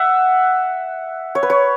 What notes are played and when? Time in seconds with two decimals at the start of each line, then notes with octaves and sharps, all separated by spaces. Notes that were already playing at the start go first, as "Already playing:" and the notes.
Already playing: E5 F#5
1.35 C#5
1.43 B4
1.50 C#5